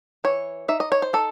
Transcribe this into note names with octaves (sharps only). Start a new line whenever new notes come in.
E3 C#5
D#4 E5
D#5
C#5
C5
D#4 A4